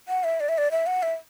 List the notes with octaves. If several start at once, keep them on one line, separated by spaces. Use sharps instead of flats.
F#5
E5
D5
E5
D5
E5
F#5
E5